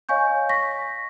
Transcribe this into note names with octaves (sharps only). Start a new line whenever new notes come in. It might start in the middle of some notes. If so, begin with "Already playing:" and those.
C#5 D#5 F5 G#5 C#6 G6
C#6 A#6 B6